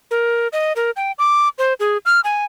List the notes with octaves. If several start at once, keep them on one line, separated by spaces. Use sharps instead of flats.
A#4
D#5
A#4
G5
D6
C5
G#4
F6
G#5